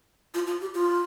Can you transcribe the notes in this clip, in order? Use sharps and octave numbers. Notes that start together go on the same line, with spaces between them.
F4
F4
G4
F4